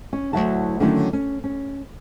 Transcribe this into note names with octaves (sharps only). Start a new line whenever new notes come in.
C#4
D2 C3 F#3 E4 F#4 A5
D3 D#3 F#3 A3 C#4 E4
C#4
C#4